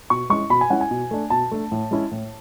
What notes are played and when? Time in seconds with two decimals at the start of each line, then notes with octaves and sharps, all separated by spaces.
0.10 B2 C#6
0.30 G#3 C#4 E4 C#6
0.50 B2 B5
0.61 G#5
0.70 G#3 C#4 E4 F#5
0.81 G#5
0.91 B2
1.11 A3 D4
1.30 B2 A5
1.51 A3 D4
1.72 A2
1.91 G#3 C#4 E4
2.11 A2